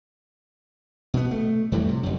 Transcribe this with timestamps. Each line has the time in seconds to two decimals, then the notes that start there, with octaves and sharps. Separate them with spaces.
1.14 B2 B3
1.31 A3
1.72 F2 A2 E3 G3
1.88 C3
2.03 F#1 F#2